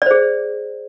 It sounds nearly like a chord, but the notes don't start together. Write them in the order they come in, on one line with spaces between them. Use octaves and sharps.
D5 C5 G#4